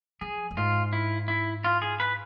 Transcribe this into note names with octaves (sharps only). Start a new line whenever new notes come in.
F3 G#4
F2
G#2 F4
E4
E4
F4
G#4
B4